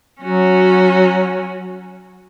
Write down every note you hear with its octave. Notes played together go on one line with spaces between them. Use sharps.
F#3 C#4 F#4